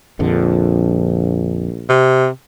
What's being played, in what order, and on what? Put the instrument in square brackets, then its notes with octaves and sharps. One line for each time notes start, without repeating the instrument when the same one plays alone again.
[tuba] A#1 [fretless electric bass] F2 D3
[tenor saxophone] C3